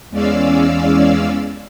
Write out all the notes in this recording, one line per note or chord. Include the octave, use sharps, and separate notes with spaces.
E2 G#3 C#4 D5 F5 E6